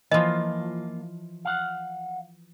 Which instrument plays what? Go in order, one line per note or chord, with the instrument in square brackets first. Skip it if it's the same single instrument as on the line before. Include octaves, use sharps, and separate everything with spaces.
[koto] E3 F3 [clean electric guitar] A#3 F4 [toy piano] D#5
[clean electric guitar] F5 F#5